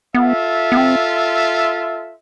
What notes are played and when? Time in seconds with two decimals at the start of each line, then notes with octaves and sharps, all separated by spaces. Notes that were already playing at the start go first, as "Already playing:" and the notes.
0.14 B3 F4 A4 E5
0.72 B3
0.77 C4